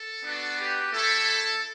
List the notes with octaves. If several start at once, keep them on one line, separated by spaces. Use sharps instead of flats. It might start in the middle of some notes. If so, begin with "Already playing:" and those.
Already playing: A4
B3 D4 F#4
G4 B4
A3 E4 G4 A4